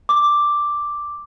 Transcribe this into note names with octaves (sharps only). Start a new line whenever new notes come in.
D6